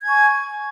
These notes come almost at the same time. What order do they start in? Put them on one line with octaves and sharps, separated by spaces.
G#6 G#5 C#6